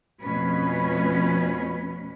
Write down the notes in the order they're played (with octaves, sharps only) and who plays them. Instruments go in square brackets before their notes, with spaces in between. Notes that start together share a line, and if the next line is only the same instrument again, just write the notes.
[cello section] F2 B2 A3 C#4 B4